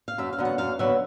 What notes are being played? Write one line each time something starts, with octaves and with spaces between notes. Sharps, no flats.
F5
F#2 E5
F5
D3 F#3 B3
F#5
F#2 F5
D3 F#3 B3 E5